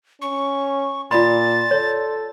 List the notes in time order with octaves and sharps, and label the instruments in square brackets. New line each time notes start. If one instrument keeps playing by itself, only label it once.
[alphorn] C#4 [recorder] C#6
[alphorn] A#2 [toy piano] F4 B5 [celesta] D5 C6 [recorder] A6
[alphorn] A4 [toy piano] C#5